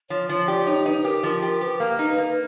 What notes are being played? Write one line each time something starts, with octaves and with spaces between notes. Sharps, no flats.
F3 C#5
F3 C#5
G4 D5
D#4 C#5
D#4 B4
G4 A#4
F3 A#4
G4 A#4
G4 B4
A#3
D#4
A#3